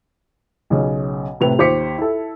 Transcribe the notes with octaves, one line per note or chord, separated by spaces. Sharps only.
B1 C#3
A2 C3 B4 F7
D#2 C5 D6 B6 C#7
E4 A4